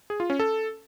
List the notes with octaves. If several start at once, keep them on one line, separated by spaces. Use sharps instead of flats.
G#4
F4
C#4
A4